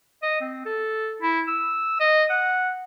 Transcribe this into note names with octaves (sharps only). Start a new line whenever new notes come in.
D#5
C4
A4
E4
E6
D#5
F#5